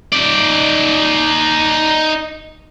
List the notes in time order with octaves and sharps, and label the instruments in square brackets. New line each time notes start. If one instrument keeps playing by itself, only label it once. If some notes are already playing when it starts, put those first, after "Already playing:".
[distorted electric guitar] D#4 D5